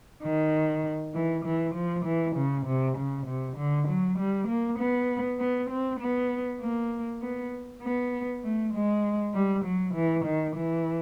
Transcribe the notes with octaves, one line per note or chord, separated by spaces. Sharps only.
D#3
E3
E3
F3
E3
C#3
C3
C#3
C3
D3
F#3
G3
A#3
B3
B3
C4
B3
A#3
B3
B3
A3
G#3
G3
F#3
E3
D#3
E3